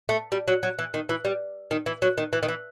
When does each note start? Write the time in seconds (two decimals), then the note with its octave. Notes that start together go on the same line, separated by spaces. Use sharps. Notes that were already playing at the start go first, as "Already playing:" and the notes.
0.09 A3
0.32 G3
0.48 F#3
0.63 F#3
0.79 E3
0.94 D#3
1.09 E3
1.25 G3
1.71 D#3
1.86 E3
2.02 F#3
2.18 D#3
2.33 E3
2.43 D#3
2.48 E3